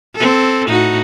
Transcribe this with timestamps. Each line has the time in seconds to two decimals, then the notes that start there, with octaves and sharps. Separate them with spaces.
0.16 C4 A4
0.68 A2 D#4 F#4